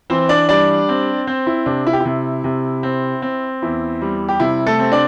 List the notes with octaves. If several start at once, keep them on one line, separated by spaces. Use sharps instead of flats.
E3 C4 C5
D4 D5
G3 D4 D5
C4
C4 C5
E4
C3 D4
E4
G4
C3 E4
C3
C4
C4
E2 E4
G3
G4
C3 E4
A3 A4
C4
D4 D5